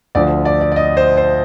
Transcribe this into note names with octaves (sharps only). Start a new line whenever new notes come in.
D2 D3 F3 D5
D5
D5
D5
D#5
C5
C5